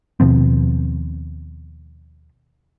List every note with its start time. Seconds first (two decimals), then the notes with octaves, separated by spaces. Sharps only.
0.20 D#2 B2 F3 C4